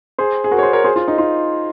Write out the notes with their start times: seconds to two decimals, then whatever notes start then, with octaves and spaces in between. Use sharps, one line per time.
0.18 G#4 C5
0.44 G#4
0.51 F#4 A#4
0.58 C#5
0.62 G#4 C5
0.73 A#4 C#5
0.84 G#4 C5
0.96 F4
1.08 D#4
1.18 F4